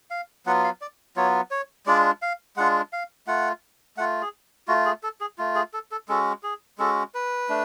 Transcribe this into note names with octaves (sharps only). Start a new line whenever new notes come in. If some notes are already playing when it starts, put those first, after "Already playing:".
F5
F#3 B3 F4 F#5
F5
D5
F#3 B3 F4 C#5
C#5
G#3 D4 F4 D5
F5
G#3 D4 F4 F#5
F5
A3 F4 F#5
A3 F4 F#5
G#4
A3 F4 F#4
G#4
A4
G#4
A3 F4
G#4
A4
A4
G#3 C#4 F#4 A4
G#4
G#3 C#4 F#4 A4
B4
A3 D4